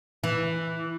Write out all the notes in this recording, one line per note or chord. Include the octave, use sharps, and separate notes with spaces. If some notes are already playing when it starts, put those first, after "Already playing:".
E3